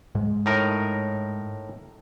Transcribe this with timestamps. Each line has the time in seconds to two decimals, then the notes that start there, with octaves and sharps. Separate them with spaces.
0.15 G#2 G#3
0.46 A2 D#4 A#4